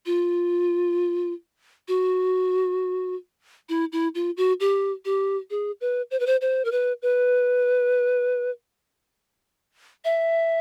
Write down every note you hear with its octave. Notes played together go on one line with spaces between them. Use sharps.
F4
F#4
E4
E4
F4
F#4
G4
G4
G#4
B4
C5
B4
C5
C5
A#4
B4
B4
E5